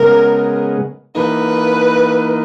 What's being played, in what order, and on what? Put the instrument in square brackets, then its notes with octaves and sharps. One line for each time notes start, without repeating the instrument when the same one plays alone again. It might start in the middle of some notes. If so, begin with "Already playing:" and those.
Already playing: [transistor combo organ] C#3 G#3 B3 [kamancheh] A#4
[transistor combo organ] E3 A#3 D#4 [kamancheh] B4